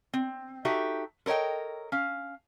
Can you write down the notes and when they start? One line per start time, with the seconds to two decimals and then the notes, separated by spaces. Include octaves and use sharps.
0.13 C4
0.65 D#4 F#4 G4 A4 E5
1.26 A4 A#4 C#5 D#5 G5
1.92 C#4 F5